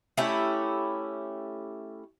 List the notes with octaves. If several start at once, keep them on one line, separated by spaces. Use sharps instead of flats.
A3 C#4 E4 G4